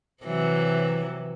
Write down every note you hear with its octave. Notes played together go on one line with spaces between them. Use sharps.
C3 E3 F#3